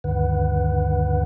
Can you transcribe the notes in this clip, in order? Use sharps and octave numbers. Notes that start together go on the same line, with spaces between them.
D2 G2 D3 D#3 B4 F#5